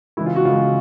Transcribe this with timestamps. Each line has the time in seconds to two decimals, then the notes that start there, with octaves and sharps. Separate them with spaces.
0.17 C#3 E3 G#3 E4
0.26 F4
0.36 F#4
0.45 C#3 E3 G#3 F4